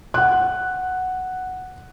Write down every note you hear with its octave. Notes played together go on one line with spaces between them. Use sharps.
F#5 F#6